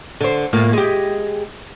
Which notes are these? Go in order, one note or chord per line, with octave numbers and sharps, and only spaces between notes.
D3 C5
A2 A#3 F4
G#3 G4